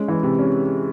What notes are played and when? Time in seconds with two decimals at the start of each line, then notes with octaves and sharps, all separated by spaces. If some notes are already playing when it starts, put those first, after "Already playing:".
Already playing: G#3 C#4
0.08 E3
0.23 C3
0.39 C#4